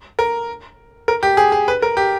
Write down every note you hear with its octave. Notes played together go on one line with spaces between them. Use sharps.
A#4
A#4
G4
G#4
G#4
B4
A#4
G4